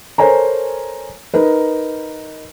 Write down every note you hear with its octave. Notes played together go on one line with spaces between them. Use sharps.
A4 A#4 C5 C#5 G#5 A#5
D#4 A#4 B4